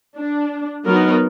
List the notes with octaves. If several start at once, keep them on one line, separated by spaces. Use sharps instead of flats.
D4
F#3 B3 D#4 A#4